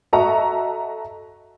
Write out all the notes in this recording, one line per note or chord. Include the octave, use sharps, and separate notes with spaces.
F#4 A4 D#5 E5 A#5 C#6